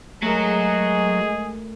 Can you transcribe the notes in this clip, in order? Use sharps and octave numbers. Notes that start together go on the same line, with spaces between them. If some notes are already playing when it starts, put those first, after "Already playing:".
F#3 G#3 A3 G#4 A#4